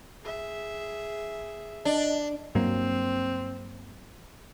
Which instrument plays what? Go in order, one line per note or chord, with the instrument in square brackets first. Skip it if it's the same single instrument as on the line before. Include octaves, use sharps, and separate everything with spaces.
[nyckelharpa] G#4 E5
[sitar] D4 [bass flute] D#5
[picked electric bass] G2 F#3 A#3 [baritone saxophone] C4